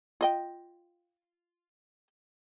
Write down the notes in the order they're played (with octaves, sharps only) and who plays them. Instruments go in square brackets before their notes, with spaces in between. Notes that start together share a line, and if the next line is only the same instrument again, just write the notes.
[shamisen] F4 D#5 G5